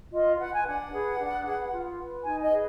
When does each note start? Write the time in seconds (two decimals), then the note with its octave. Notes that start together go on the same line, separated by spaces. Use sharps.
0.13 F4 D#5
0.39 B4 F#5
0.54 G#5
0.66 D4 F#5
0.92 G#4 B4
1.19 D4
1.45 G#4 B4
1.71 F4
1.98 B4
2.24 D#4 G#5
2.42 D#5
2.51 G#4 B4